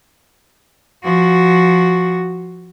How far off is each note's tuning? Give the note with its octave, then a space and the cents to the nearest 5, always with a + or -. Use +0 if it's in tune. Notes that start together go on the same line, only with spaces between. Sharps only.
F3 +0 F#4 +0